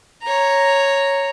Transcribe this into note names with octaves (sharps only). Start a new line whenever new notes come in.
C#5 A#5